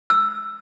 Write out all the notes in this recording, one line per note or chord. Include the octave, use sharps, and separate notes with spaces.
E6